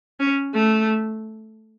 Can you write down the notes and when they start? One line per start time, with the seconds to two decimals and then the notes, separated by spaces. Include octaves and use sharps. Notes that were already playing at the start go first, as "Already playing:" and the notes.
0.20 C#4
0.54 A3